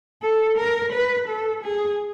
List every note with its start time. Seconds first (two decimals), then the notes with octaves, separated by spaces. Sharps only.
0.22 A4
0.57 A#4
0.92 B4
1.28 A4
1.64 G#4